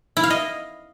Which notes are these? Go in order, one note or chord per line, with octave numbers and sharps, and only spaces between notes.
E4
F5
D#5